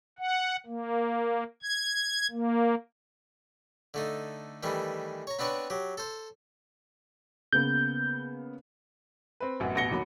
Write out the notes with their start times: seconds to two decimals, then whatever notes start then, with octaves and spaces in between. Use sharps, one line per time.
0.19 F#5
0.66 A#3
1.62 G#6
2.31 A#3
3.94 D3 A3 D#4
4.63 D#3 E3 G3 A3
5.27 C#5 A#5
5.39 B3 C4 D4 B4 C#5
5.70 F#3 G4
5.97 A4 C5
7.53 C#3 A#3 B3 G6
9.40 C4 B4
9.60 A1 F#2 B3
9.75 A1 B2 F#5 A#6 C#7 G7
9.91 D#2 F#3 B5